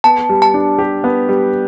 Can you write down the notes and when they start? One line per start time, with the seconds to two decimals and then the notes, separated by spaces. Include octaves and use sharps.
0.04 B3 A5
0.29 G3
0.42 A5
0.54 D4
0.79 G4
1.04 B3
1.29 G3